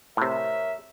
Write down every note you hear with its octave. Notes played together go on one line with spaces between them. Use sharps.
A2 C3 A#4 C#5 E5